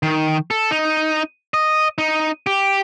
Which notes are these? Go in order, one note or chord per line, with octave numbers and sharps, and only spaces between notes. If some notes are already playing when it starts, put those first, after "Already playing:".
D#3
A4
D#4
D#5
D#4
G4